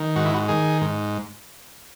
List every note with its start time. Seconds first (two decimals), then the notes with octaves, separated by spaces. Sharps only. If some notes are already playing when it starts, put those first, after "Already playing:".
Already playing: D#3
0.16 G#2 F#4
0.25 E4
0.34 F#4
0.48 D#3 G#4
0.81 G#2